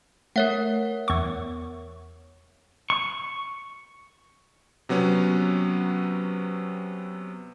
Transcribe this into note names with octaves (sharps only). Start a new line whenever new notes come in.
A3 A#4 C#5 F#5
E2 C#6
C#6
C3 F#3 B3 C#4